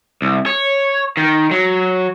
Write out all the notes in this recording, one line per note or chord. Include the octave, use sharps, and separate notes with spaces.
C2
C#5
D#3
F#3